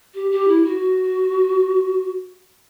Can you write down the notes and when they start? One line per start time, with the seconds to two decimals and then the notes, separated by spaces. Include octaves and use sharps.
0.14 G4
0.31 G4
0.48 E4
0.65 F#4